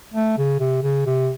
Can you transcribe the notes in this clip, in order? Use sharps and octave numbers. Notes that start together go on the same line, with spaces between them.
A3
C#3
C3
C#3
C3